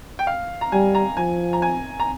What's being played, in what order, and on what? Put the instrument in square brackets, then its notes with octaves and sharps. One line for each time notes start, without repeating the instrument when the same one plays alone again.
[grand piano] G5
F5
A#5
[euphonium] G3 [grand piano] G#5
[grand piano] A#5
[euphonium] F3 [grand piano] G#5
[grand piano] A#5
G#5
A#5